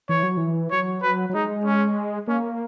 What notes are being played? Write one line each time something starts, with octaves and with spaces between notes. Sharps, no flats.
E3 C#5
F#3
E3
F#3 C#5
B4
F#3
G#3 D#4
C#4
A#3 C#4